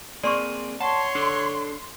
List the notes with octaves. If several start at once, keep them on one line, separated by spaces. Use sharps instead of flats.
A#3 C4 G#4 D5 C6 C#6
C#5 F#5 A5 C6
D4 A4